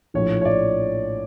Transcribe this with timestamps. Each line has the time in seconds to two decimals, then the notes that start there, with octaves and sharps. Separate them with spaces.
0.14 A#1 A2 F3 C#5
0.41 C#5
0.45 D5